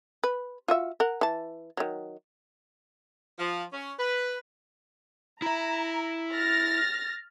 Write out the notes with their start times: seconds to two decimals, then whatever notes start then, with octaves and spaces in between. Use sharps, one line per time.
0.24 B4
0.68 F4 F#4 E5
1.00 A#4 F#5
1.21 E3 A5
1.77 D#3 F#3
3.38 F3
3.73 C#4
3.98 B4
5.42 E4 E5 A#5
6.33 F6 A6 A#6